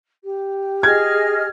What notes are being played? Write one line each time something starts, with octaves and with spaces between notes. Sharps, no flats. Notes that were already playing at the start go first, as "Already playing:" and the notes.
G4
G#4 D#5 F6 G#6